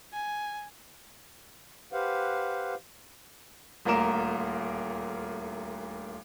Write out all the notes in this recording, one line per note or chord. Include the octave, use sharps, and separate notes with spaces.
G#5
G4 B4 C5 F5 F#5
D#1 D2 A#3 A#4 E7